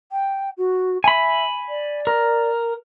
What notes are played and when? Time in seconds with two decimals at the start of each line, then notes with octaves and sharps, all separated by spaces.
0.11 G5
0.57 F#4
1.04 E5 G#5 B5
1.68 D5
2.07 A#4